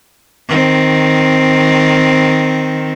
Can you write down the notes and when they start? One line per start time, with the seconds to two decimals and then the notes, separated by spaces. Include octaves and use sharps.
0.48 D#3 C4